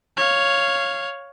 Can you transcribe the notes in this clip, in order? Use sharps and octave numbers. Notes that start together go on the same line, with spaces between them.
C#5 F5